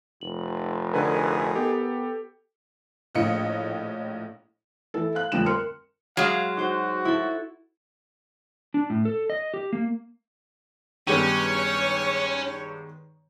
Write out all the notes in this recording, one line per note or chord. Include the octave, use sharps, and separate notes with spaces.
F1 F#7
D3 D#4 G#4 A#4 B4 G#5 A#5
B3 G4 A4
A#1 A2 A#3 D#5 C#7
E3 E4 A4
F5 F#6
A#1 F2 D3 G3 E7
A#4 C6 F6 C#7
F#3 G#3 F5
D#4 F#4 C5
E4 A4
D4
A2
A4
D#5
G4
A#3
G2 D#3 G#3 B3 C#4 G4 C#5 D#7